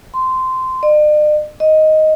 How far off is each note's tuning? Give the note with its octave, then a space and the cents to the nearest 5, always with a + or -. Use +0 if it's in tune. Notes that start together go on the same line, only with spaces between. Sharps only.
C6 -15
D5 +45
D#5 +5